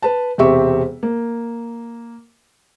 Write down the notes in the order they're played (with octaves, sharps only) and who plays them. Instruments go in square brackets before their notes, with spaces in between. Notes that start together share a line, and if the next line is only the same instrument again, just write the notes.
[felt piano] B4 A5
E1 C3 C4 G4 E5 C#6
A#3